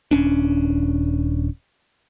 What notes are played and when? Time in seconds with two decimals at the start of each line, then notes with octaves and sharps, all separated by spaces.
0.11 D#1 C#4 D4